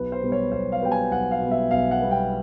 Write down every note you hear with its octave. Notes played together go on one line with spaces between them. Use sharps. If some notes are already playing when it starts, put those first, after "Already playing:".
Already playing: B1 B4
C5
B2 G3 B3
C#5
B1 C5
F5
B2 G3 B3 G5
G#5
B1 F#5
F5
B2 G3 B3
E5
B1 F5
F#5
B2 G3 B3
G5